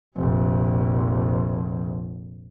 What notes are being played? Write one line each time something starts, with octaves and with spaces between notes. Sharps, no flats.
F1 A#1